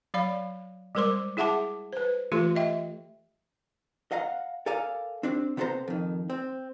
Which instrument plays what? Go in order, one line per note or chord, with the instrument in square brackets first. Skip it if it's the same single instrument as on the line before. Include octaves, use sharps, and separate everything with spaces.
[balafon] F#3 D5 F5 B5
G3 G#3 A#4 C5 C6 D6
E4 G#4 E5 F#5 A5 D6
B4 C5
E3 A3 F4 G4 A4 C6
D#5 E5 G5
[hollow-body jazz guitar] D#5 F5 F#5 A#5
A4 A#4 D5 F5 G#5 A#5
C4 D4 G4 C5
C3 B3 F4 A4 C5 A#5
F2 D#3
C4